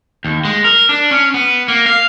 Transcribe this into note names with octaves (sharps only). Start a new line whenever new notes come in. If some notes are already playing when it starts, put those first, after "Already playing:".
D#2
G#3
A#4
D4
C#4
B3
A#3
F5